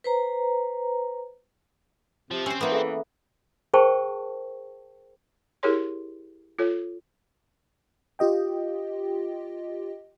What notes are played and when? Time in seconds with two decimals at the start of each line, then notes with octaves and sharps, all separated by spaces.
0.04 B4 C5 A#5
2.31 C3 F3
2.46 C4 C#4 C5 E6
2.61 E3 A#3 B3
2.72 G#4 A4 E5
3.74 G#4 A#4 C5 G5 A5 C#6
5.63 E4 G4 G#4 A#4 C#5 C6
6.59 F4 A4 C#5
8.19 F4 G4 D#5 G5